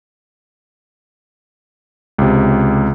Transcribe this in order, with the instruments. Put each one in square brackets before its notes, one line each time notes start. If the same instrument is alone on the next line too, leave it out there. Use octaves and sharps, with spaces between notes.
[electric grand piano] C#2 C3